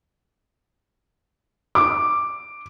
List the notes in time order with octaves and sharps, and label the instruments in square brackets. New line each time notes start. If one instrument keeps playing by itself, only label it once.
[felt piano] D6